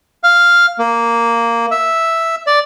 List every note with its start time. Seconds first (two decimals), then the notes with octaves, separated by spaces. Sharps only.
0.24 F5
0.78 A#3
1.71 E5
2.47 D5